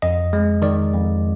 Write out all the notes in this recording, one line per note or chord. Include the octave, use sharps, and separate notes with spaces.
F2 D#5
G#3
D#3 D5
F2